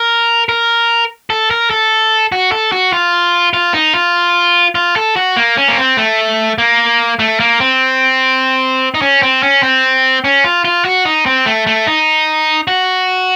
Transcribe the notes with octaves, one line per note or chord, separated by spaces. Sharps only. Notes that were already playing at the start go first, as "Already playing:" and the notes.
Already playing: A#4
A#4
A4
A#4
A4
F#4
A4
F#4
F4
F4
D#4
F4
F4
A4
F#4
A#3
C#4
A#3
C4
A3
A#3
A3
A#3
C4
D#4
C#4
C4
C#4
C4
C#4
F4
F4
F#4
D#4
C4
A3
A3
D#4
F#4